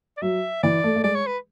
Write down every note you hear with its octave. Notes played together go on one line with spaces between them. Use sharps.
D5
F#3 E5
E3 D5
A3
A3
G#3 D5
C#5
B4